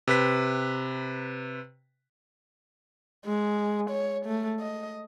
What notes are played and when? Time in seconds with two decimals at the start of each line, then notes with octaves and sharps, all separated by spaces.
0.07 C3 B4 B6
3.25 G#3
3.90 C#5
4.26 A3
4.60 D#5